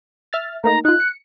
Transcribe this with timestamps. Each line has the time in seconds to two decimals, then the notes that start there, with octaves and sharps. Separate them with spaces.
0.33 E5 F6 A6
0.64 A3 A#3 D#4 A#5
0.85 D#4 F4 F#6
1.00 C#7